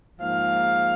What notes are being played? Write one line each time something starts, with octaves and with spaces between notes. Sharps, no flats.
G#2 F3 A#3 F5